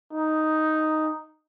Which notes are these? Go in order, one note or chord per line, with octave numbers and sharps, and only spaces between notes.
D#4